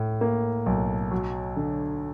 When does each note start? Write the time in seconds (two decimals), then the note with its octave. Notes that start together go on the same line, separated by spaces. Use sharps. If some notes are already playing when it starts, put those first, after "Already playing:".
Already playing: A2
0.21 A#3
0.66 B1
1.11 F#3
1.56 D3